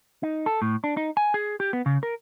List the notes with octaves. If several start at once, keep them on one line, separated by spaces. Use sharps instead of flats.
D#4
A4
A2
D4
D#4
G#5
G#4
G4
B3
C#3
A#4